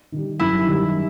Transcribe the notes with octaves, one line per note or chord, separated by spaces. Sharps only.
D#3 G3
F#2 E4
D#3 G3